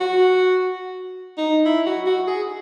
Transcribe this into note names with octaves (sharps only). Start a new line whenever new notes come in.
F#4
D#4
E4
F#4
F#4
G#4